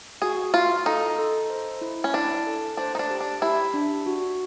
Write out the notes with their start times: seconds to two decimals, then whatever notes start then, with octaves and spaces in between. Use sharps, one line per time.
0.22 F#4 G#4
0.54 F4 F5
0.85 D#4 A4
1.18 A4
1.50 C5
1.81 E4
2.04 C#4
2.14 D4 E4
2.47 A4
2.77 D4 C5
2.95 D#4
2.99 D4
3.10 G4
3.20 D4
3.42 E4 G4
3.74 D4
4.06 F#4